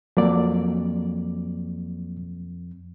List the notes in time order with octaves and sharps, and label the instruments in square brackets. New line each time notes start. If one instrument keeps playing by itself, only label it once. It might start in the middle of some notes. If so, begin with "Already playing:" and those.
[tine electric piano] F2 [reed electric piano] F#3 A#3 D5